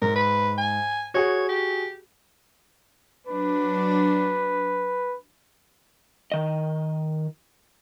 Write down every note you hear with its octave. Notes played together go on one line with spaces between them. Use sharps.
G#2 A#4
B4
G#5
F#4 G#4 C#5 F#5
G4
F#3 D4 B4
D#3 D#5